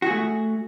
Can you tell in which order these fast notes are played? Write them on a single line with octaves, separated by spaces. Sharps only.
F#4 G#4 A3